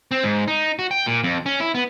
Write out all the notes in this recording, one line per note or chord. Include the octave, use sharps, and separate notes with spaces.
C4
G#2
D#4
F#4
G5
A#2
F2
C#4
E4
B3